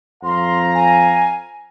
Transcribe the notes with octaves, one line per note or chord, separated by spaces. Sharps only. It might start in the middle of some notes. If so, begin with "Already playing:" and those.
F2 F5 A#5 C6
G#5